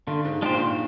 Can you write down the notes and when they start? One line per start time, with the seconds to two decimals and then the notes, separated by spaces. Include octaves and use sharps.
0.07 G2 D3
0.25 G#2
0.42 A#2 G#3 D4 G4 C5
0.54 G2
0.60 G#2